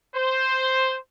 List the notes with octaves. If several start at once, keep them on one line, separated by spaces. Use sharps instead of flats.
C5